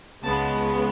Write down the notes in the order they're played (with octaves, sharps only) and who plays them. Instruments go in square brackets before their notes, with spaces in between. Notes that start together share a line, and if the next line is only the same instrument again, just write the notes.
[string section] C#2 C#3 G#3 B3 A5